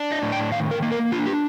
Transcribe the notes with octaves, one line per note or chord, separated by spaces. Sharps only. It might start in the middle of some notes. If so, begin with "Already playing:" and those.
Already playing: D4
D#5
A2
G5
D#3 F5
A#4
A#3
A#4
D4 F4
G4